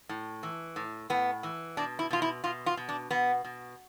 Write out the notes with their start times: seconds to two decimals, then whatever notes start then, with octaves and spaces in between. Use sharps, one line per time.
0.09 A2
0.43 E3
0.76 A2
1.10 A2 B3
1.43 E3
1.77 B2 D4
1.99 E4
2.11 B2 F4
2.22 E4
2.44 B2 F4
2.66 F4
2.77 B2
2.89 D4
3.11 B2 B3
3.45 B2